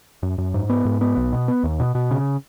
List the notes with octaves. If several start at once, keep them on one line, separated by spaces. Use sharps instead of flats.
F#2
F#2
G#2
B3
G#2
B3
B1
B2
B3
D#2
B2
B2
C#3